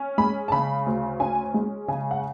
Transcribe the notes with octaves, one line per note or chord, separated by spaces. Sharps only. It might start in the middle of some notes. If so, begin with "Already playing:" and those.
Already playing: C#4
G#3 B5
A5
C#3 B5
D2
C#4 G#5
G#3
C#3 G#5
F#5